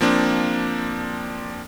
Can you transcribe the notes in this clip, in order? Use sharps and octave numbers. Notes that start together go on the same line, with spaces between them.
F3 A#3 C4 D4